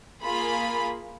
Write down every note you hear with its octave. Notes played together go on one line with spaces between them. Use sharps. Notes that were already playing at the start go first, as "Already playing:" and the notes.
A#3 F4 G#4 B5